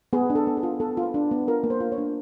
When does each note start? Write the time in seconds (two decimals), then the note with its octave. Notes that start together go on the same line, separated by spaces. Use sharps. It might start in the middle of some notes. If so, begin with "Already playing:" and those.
0.13 B3 G#4
0.30 D4
0.35 A4
0.47 B3
0.57 G#4
0.63 F4
0.80 B3 A4
0.97 F4
1.03 B4
1.14 D4
1.31 B3
1.47 F4 A#4
1.64 A#3
1.70 C5
1.80 F4
1.92 C#5
1.98 D4